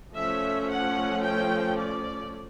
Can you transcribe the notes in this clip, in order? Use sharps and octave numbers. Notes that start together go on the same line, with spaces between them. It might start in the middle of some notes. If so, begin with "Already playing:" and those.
F3 A3 C#4 E5
F#5
G5
D5